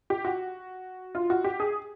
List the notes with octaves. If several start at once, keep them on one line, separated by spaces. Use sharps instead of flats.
G4
F#4
F4
F#4
G4
G#4